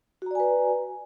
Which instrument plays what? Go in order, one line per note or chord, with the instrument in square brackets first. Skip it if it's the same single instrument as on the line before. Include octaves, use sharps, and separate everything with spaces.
[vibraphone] F#4
A#5
D5
G#5
B4